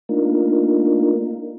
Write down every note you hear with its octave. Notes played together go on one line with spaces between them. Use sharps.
A3 A#3 D4 D#4 F4 A#4